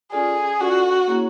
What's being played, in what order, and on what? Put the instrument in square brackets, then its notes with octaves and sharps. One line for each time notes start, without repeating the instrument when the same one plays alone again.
[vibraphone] C#4 F4 A4 D5 [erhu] G#4
[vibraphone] C#4 F4 A4 D5 [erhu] F#4
[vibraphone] A#3 C#4 E4 G#4 C#5